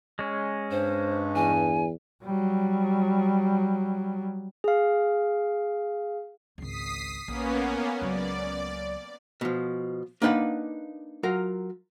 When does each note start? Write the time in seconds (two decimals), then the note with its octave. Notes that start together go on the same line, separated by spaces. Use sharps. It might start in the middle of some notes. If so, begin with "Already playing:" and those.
0.19 G#3 C#4
0.71 G2 C5
1.35 E2 G#5
2.23 F#3 G3
4.64 G#4 F5
6.58 G#1 C#2 D#6 B6 C7
7.28 A#1 A#3 B3 C#4
8.01 C#2 F#3 D5
9.41 B2 F3
10.22 A#3 D4 D#4 B4 F5 F#5
11.23 F#3 F4 A#4